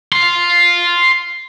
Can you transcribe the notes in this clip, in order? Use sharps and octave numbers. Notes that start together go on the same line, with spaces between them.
F5 C6